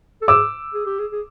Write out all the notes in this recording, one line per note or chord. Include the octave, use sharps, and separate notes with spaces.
A4
G#4 D6 E6
G#4
G4
G#4
G#4